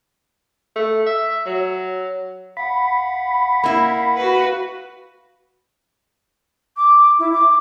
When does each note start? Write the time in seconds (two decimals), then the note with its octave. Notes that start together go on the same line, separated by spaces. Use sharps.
0.76 A3
1.07 E5
1.46 F#3
2.57 F5 F#5 B5
3.64 A#3 E4
4.17 F#4 B4
6.77 D6
7.19 E4
7.33 D6